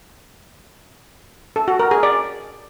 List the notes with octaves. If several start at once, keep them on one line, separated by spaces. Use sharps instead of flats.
A4
F#4
A#4
G#4
D5